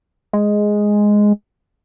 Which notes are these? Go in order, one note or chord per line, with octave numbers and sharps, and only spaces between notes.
G#3